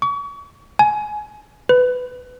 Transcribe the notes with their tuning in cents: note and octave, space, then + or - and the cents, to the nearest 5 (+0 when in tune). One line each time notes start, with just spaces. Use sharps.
C#6 +35
G#5 +20
B4 +15